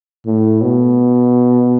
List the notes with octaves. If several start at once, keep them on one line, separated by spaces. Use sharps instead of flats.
A2
B2